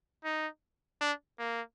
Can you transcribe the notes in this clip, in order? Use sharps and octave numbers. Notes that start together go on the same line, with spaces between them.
D#4
D4
A#3